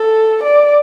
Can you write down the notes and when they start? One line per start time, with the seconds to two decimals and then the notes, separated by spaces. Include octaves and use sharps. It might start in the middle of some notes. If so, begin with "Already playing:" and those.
Already playing: A4
0.43 D5